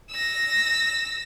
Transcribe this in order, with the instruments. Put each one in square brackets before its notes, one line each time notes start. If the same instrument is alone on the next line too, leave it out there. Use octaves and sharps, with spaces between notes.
[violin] E6 A#6